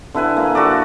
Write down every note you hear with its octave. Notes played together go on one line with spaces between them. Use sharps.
D3 E4 B4 G#5
A#3
F#4 A4 D5